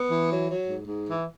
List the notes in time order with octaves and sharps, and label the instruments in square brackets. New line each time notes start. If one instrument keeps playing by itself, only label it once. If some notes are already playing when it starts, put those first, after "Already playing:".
Already playing: [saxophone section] B3
E3
F#3
F#3
G#2
G#2
E3